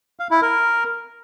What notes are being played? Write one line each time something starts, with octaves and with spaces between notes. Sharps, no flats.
F5
E4
A#4